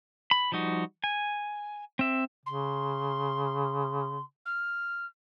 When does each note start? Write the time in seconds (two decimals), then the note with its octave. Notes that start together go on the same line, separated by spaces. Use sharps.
0.31 B5
0.52 F3 G3 D#4 F#4
1.04 G#5
1.99 C4 E5
2.46 C#3 C6
4.45 F6